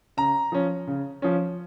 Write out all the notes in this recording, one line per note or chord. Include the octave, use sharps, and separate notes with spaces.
C#3 A#5
F3 C#4
C#3
F3 C#4